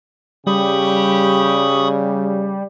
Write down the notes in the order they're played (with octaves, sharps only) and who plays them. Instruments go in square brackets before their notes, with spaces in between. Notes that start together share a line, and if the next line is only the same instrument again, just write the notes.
[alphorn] C#3 [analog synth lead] G3 [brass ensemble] G4 [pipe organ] B5 C#6 D#6